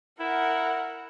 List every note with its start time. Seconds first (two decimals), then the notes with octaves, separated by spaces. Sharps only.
0.20 E4 A#4 F#5